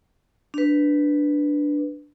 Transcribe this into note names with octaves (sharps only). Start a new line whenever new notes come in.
D4 B4